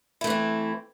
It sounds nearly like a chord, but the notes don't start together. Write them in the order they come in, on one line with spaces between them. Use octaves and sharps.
E4 A3 E3 C4